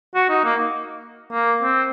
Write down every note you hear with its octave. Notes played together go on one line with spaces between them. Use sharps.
F#4
D#4
A#3
A#3
C4